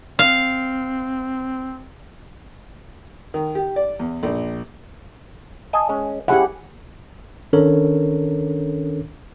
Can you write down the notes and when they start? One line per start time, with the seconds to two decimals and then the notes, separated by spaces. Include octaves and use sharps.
0.19 C4 F5
3.34 D#3
3.55 G4
3.76 D5
3.99 E2
4.23 A#1
5.73 D#5 G#5 A5
5.89 G#3 C#4
6.28 C#4 E4 G4 G#4 F#5
7.53 D#3 C#4 D4 A4 A#4 C#5